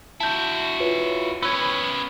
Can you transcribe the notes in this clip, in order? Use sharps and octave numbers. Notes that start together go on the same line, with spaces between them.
E4 F#4 A5 G6
F4 B4 C#5
B3 C#4 B4 C#5 E6